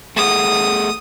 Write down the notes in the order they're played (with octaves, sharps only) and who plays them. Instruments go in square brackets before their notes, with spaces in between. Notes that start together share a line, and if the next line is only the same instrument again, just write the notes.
[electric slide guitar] A3 G#4 F#5 [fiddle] D#6